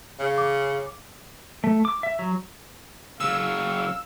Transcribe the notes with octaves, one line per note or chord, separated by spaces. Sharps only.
C#3
D6
A3
D6
E5
F#3
C#3 F#3 F5 E6